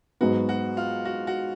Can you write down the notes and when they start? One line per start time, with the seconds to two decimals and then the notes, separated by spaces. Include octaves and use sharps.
0.21 G#2 F#3 B3 F#4
0.49 F#4
0.77 F4
1.05 F#4
1.27 F#4